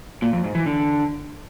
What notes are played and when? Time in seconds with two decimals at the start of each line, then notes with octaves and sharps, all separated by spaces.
0.22 A#2
0.33 F2
0.44 G#2
0.55 E3
0.66 D3